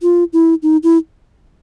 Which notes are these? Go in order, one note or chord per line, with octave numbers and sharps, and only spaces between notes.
F4
E4
D#4
E4